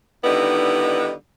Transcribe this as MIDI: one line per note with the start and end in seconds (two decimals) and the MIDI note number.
0.25 1.12 50
0.25 1.12 51
0.25 1.12 55
0.25 1.12 59
0.25 1.12 63
0.25 1.12 64